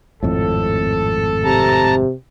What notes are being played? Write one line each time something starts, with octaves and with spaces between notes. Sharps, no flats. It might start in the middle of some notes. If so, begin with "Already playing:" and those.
G#1 F2 A2 A4
C3 A5 A#5